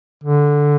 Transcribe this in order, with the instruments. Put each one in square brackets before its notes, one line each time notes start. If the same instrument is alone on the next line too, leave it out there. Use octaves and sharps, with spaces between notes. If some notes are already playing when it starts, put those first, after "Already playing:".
[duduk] D3